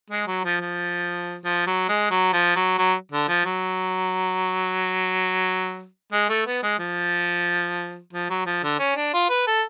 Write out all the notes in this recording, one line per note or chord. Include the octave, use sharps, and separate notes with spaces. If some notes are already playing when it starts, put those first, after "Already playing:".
G#3
F#3
F3
F3
F3
F#3
G#3
F#3
F3
F#3
F#3
D3
F3
F#3
G#3
A3
B3
G#3
F3
F3
F#3
F3
D3
C#4
D4
F4
B4
A4